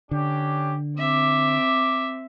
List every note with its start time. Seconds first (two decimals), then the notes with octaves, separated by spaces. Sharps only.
0.11 D3 C#4 D4 G4
0.99 C4 E5 D6